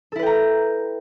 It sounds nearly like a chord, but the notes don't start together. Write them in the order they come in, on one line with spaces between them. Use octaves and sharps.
A4 E4 B4 G5 A#5